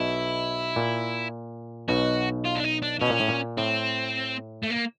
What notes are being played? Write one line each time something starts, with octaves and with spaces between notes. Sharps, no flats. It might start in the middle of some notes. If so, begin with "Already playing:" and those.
Already playing: B1 B2 E4
A#2
B1 B2 F#4
F4
D4
D#4
D4
B2 C#4
A#2
A2
A#2
A2 C4
A3
A#3